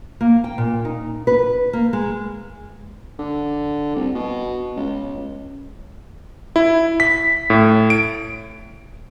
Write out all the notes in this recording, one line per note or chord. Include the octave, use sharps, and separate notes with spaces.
A#3
G5
A#2
D#4
B4
A#3
G#3
D3
C2
B2
C#2
E4
B6
A2
D7